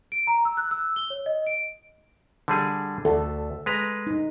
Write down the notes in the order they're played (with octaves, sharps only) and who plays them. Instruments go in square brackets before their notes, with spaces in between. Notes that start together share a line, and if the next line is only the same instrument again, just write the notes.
[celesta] D7
A#5
E6
F#6
E6
G7
C#5
D#5
D7
[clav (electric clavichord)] D3 G3 G#4
[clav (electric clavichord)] D2 [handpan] A4
[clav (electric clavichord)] G#3 B4 A#5
[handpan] D#4